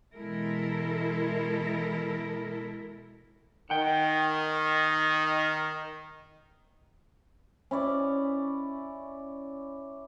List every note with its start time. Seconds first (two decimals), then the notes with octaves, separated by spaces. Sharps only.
0.15 B2 E3 G#3 E4 A4 A#4
3.70 D#3 F#5 G5
7.71 C#4 E4 D5 D#5